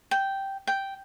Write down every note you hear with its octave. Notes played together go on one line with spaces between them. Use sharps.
G5
G5